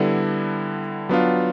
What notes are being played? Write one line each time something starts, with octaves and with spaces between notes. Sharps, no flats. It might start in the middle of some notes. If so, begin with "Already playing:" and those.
Already playing: D3 G3 B3 E4 A4
F#3 B3 D4 F4